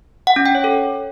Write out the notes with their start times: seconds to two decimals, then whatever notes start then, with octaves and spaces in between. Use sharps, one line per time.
0.27 F#5
0.36 C#4
0.46 G5
0.55 C#5
0.64 A4